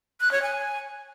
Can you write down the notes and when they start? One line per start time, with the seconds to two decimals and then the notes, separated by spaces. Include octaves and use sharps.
0.20 F#6
0.31 C#5
0.42 G#5